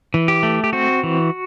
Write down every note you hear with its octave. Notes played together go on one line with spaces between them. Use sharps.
E3
G4
A3
G4
C4 F#4
E3